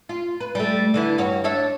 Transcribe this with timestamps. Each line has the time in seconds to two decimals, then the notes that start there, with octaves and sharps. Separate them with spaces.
0.09 F4
0.40 B4
0.55 G3 A3
0.94 D3 E3 E4
1.18 G2 F#4 C#5
1.44 D4 C#5 E5